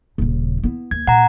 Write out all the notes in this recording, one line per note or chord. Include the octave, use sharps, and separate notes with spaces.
D#1 C#3
B3 E4
D#2 G#6
A#2 F#5 A#5